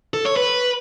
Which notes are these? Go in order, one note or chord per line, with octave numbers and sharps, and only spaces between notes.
A4
C#5
B4